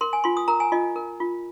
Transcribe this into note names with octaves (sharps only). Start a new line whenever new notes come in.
A#4 C6
G#5
F4 C6
D#6
A#4 A#5
G#5
F4 D#5
A#4
F4